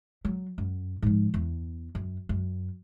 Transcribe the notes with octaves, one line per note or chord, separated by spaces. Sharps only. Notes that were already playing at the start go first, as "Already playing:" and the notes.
F#3
F#2
G#2 F3
E2
F#2
F#2